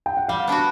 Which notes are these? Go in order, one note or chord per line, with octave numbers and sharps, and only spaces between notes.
G5
F#5
G3 F5
B3 D4 F#4